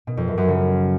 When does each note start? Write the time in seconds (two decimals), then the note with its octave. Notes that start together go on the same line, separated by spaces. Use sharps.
0.07 B2
0.17 F2
0.27 F#2
0.38 F#2
0.48 C#3